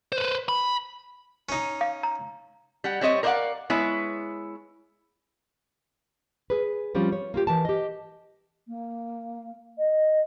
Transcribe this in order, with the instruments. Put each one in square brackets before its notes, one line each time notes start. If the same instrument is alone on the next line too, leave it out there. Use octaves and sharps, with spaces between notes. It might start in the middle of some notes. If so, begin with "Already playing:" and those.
[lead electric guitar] B4 C5
B5
[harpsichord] C#4 D#4
[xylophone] F5
A#5
[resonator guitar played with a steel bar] G3 F#5
G3 C4 C#5 D#5
A#4 C5 D5 D#5 F5 F#5
G#3 B3 E4 C#5
[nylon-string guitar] G#4 B4
F3 G3 C4 C#4 F4
C#5
A#3 F4 G4
E3 A#4 A5
G4 D#5
[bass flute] A#3
D#5